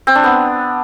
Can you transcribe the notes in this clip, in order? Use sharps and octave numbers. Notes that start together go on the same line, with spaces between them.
C4
D4
B3